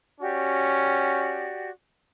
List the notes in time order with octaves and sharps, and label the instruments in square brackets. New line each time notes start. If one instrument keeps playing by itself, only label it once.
[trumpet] C#4 [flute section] F#4 G4 D5